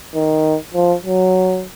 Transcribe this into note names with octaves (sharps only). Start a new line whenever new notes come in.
D#3
F3
F#3